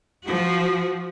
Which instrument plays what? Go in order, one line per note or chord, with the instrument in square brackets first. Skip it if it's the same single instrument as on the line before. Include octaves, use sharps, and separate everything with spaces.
[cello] F3 F#4